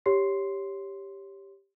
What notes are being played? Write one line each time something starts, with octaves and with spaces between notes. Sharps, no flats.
G4 C#5 C6 C7